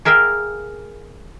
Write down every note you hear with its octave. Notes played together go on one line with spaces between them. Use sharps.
G#4 A#4 E5 F5 G5